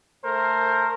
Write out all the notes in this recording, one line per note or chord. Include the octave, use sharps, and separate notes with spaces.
A3 A#4 C5